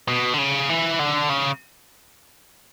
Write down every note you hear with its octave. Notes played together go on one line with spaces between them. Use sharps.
B2
D3
C#3
E3
D3
C#3